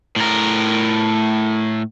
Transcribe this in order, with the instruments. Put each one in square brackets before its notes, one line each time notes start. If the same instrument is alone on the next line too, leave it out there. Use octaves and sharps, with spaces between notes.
[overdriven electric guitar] A2 A#4